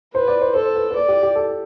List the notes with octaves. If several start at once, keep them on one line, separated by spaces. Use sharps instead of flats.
B4 C5
D5
C5
A4 C5
B4
B4
A4 D5
G4
G4
A4